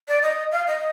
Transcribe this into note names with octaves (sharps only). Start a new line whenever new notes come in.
D5
D#5
F5
D#5